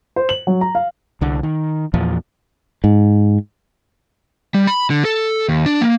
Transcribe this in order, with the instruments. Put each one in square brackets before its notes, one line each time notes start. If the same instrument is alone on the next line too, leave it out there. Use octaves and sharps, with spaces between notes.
[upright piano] C5
F#7
F#3
A#5
F5
[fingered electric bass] C2 D3
D#3
E2 A#2 F3
G#2
[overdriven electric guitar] G3
B5
D3
A4
D#2
D4
A#3